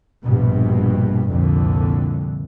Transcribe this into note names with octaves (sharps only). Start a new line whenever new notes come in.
A#1 G2 B2
C2 F2 A#2 D3